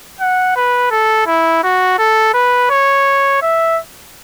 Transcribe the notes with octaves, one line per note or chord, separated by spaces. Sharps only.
F#5
B4
A4
E4
F#4
A4
B4
C#5
E5